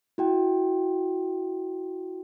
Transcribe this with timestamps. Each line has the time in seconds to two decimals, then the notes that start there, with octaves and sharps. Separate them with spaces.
0.18 E4 F#4 G5